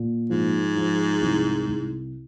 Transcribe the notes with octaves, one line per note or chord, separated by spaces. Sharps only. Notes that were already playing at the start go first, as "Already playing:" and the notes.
Already playing: A#2
G#2 F3
F3
C2
C2